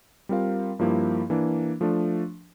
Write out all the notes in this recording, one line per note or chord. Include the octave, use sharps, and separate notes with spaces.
G3 C4 F4 A#4 F5
G2 F3 A#3 E4 G4
E3 A#3 D4
F3 A3 D4